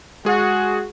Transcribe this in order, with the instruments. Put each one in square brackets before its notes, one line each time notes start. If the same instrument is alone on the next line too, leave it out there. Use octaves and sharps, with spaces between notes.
[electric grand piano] G#3 G#4 [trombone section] F#4